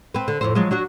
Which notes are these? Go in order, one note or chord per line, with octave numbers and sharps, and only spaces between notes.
C4 B4
D3
F2 A2 C5
F3 F#3 G#3
F#3 D4 F#4